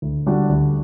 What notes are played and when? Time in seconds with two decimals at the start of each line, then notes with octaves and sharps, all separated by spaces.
0.02 D2
0.26 D3 G3 D4 F#4
0.49 D2